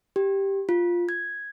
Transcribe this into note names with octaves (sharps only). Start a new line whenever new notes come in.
G4
F4
G#6